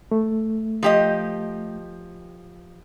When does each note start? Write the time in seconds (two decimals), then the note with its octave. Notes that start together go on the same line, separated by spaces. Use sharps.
0.11 A3
0.83 F3 G4 D#5